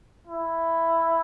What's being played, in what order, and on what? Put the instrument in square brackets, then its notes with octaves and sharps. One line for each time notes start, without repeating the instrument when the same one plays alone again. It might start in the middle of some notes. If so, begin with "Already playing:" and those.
[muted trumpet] E4